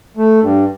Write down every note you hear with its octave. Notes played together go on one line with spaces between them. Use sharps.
A3
G2